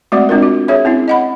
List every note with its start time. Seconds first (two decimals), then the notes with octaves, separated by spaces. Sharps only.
0.12 G#3 A3 C4 F#4 D5 F#5
0.29 G#3 C4 D4 F4 A#4
0.42 F#4
0.68 G#4 C#5 E5
0.85 C4 C#4 E4
1.08 D#5 F#5 B5